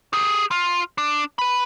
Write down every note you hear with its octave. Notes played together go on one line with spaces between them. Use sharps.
G4 G#4
F4
D4
B4 B5